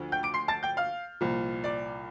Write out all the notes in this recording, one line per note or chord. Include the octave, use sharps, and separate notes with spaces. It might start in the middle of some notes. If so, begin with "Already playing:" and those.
Already playing: D2 D3 F3
G5 G6
D6 D7
C6 C7
A5 A6
G5 G6
F5 F6
C2 A#2 F3
D5 D6